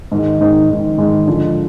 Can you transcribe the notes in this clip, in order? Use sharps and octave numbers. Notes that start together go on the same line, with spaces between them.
G#2 D#3 G#3
G#2 D#3 G#3
G#2 D#3 G#3
G#2 D#3 G#3
D3 F3 G#3